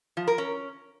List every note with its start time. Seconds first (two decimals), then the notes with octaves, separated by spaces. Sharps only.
0.17 F3
0.27 A#4
0.38 C#4